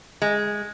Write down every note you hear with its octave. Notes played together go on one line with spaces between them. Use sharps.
G#3